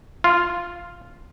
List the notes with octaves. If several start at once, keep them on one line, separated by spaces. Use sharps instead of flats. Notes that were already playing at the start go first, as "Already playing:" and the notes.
F4